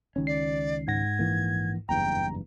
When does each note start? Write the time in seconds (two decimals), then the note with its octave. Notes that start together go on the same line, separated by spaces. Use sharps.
0.16 C#2 D#3 C#4
0.27 D5 C7
0.87 G#2 F#5 G#6 A#6
1.19 A#1 E3 A#3
1.89 F#1 E2 G2 G5 A#5